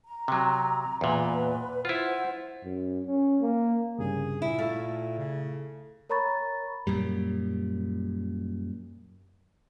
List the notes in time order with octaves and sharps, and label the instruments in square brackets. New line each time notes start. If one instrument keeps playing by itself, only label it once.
[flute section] A#5
[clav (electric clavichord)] C3 F#3
[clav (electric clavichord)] E2 A#2 [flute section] B4
[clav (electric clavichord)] E4 F4 [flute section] C5 F#5
[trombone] F#2
C#4
A#3
[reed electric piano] C2 G2 C#3 [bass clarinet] G#4
[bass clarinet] A#2 [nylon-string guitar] E4
[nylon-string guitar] A3 [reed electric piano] E4 E5 F5
[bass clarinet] C#3
[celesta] A#4 C#5 A#5 B5 C#6 A6
[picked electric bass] F#2 A#2 G3